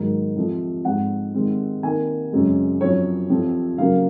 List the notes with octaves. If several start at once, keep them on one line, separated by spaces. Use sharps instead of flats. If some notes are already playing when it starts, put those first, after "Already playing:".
Already playing: G#2 D#3 F#3 A#3
F2 C3 F3
G#2 F3 C4 F#5
C3 D#3 G#3 C4
C3 D#3 A#3 G#5
F#2 C#3 G#3 C4
F#2 F3 C4 C#5
F2 C3 F3 C4
C#3 F#3 A#3 F5